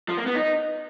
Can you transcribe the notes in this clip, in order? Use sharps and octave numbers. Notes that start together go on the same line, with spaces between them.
F3
A#3
B3
D#4